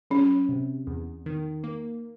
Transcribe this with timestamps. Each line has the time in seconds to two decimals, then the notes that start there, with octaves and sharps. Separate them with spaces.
0.10 F#3 C#4
0.49 C3
0.87 E2
1.26 D#3
1.64 A#3